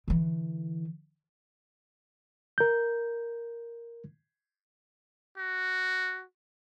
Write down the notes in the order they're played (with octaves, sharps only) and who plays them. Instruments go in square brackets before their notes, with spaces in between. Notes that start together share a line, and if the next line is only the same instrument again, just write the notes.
[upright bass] D3 E3
[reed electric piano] A#4 G6
[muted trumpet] F#4